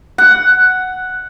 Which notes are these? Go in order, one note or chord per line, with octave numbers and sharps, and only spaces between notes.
F#5